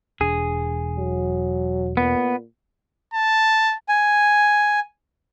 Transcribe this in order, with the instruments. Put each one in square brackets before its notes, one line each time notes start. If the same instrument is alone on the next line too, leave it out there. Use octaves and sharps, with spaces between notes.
[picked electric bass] E1 D4 [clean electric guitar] G#4
[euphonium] F#3
[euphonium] A#2 [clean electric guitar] B3
[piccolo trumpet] A5
[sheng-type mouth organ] G#5